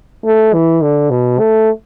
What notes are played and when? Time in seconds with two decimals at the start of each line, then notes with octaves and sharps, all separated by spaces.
0.25 A3
0.53 E3
0.82 D3
1.10 B2
1.39 A3